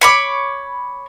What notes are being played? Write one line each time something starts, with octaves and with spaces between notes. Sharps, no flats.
C#5 B5 D6